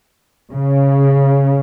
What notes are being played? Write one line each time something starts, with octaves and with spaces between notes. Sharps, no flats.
C#3